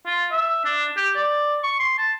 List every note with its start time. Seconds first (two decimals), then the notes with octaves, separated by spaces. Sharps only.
0.06 F4
0.32 E5
0.65 D4
0.97 G4
1.16 D5
1.63 C#6
1.79 C6
1.98 A5